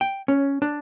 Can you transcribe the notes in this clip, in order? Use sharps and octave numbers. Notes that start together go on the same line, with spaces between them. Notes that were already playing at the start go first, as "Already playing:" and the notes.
G5
C#4
D4